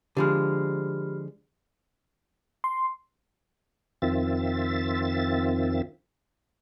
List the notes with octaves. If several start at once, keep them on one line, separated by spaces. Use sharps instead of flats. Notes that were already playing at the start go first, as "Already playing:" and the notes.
D3 F3 G#3 G4 B5 F6
C6
F2 D#3 C4 F4 E5 A6